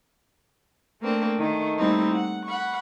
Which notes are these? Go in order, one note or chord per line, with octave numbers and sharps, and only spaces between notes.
A3 A#3 C4 D4
D#3 A3
G3 A3 A#3 C4 D#4 E4
F#5
F#5 B5 C#6